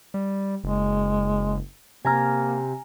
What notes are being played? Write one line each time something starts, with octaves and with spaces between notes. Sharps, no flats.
G3
F#1 G#3
C3 A#3 G#5 A#5 F6